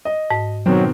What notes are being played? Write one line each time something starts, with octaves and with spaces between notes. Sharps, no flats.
D#5
G#2
B2 D#3 F#3 C4